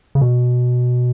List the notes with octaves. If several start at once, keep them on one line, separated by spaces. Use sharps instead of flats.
C#3
B2